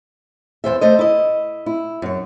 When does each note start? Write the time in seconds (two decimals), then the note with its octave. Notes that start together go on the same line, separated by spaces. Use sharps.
0.64 E2 E3 C5 E5
0.81 A3 C5 D#5
0.99 E4 D#5
1.66 E4
2.02 F#2 C#5